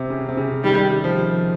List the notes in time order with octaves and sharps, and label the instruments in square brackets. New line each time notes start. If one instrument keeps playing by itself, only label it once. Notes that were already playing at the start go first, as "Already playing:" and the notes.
Already playing: [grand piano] C3
C#3
C3
C#3
[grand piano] D#3 [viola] G3
[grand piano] F3